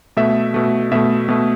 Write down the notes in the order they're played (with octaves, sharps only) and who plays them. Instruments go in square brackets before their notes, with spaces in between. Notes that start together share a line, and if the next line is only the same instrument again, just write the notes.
[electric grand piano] B2 A3 E5
B2 A3
B2 A3 E5
B2 A3